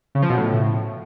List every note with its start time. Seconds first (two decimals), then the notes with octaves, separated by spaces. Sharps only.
0.15 C#3
0.22 F3
0.30 B2
0.37 A2